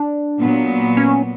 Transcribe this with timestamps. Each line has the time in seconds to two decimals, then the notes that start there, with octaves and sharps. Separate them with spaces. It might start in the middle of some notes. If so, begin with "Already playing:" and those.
Already playing: D4
0.39 A#2 F#3 B3
0.97 C#4